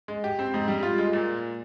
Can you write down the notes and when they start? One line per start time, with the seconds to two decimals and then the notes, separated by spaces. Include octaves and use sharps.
0.08 G#3
0.24 G4
0.39 C4
0.54 G#2
0.68 G3
0.83 F4
0.98 G#3
1.13 A#2